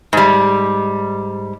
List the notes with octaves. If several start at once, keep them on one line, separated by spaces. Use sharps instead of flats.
G#2 G3